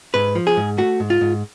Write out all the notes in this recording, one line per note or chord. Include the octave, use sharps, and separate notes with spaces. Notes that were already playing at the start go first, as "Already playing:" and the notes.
G#2 B4
F3
G#4
G#2
A3 F#4
G#2
F4
G#2